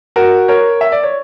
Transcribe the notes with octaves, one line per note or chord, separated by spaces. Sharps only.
F#4 A#4
A#4 C#5
E5
D5
C#5